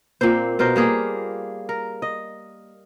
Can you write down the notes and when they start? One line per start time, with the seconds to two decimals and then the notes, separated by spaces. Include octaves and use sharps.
0.21 A#2 A#3 C4 C5
0.59 B2 F4 A#4 C5
0.76 G3 A#3 G#4
1.69 A#4
2.02 D#5